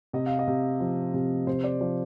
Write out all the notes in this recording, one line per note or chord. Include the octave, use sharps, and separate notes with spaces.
C3 D#5
F5
D#5
C3
F3
C3
C3 C5
D5
F3 D5